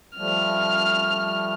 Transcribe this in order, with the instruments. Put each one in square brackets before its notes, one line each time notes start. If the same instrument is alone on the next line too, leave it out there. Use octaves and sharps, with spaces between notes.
[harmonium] F3 G3 A3 [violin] F6